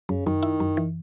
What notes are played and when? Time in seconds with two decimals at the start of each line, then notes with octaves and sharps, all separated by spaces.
0.09 F#2 C#3
0.26 F#2 D#3
0.43 E4
0.60 F#2
0.77 E3